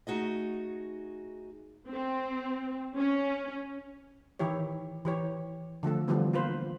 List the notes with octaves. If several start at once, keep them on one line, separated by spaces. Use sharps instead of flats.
A3 D#4 F#4 G#4 D#5
C4
C#4
D#3 E3 E4 G4 C#5
E3 G4 C#5
D3 F3 A3 A4
D3 E3 F3 G3 B3
A#3 F4 B4 C5